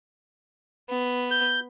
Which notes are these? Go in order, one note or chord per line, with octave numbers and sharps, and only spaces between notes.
B3
G6